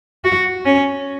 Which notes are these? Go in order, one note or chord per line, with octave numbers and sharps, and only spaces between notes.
F#4
C#4